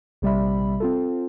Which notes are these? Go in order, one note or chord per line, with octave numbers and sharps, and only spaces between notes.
A#1 C3 G3 D5 E5 B5
C4 F4 A4